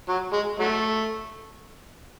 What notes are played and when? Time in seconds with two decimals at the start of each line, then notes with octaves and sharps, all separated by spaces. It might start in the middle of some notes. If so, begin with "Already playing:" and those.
0.09 F#3
0.33 G#3
0.59 F#3 A3